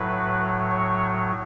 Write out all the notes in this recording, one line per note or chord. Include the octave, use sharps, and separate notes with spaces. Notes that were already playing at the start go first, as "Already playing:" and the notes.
Already playing: A2 F#3 B4
C#5